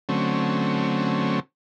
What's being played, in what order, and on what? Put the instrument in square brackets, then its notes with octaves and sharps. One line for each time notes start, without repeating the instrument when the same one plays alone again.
[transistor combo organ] D3 F#3 A3 C4 C#4